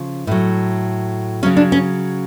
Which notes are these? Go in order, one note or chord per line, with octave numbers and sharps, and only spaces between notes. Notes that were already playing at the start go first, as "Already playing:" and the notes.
Already playing: C#3 F3
A2 F#3
C#3 F#3 C#4
D4
C#4